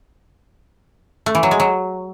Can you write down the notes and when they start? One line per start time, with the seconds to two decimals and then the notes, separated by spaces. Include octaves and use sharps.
1.26 A3
1.35 E3
1.43 F#3
1.51 G#3
1.60 F#3